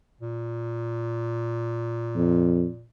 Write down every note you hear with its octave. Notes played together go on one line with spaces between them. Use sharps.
A#2
F2